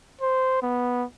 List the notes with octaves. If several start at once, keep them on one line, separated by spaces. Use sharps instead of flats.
C5
B3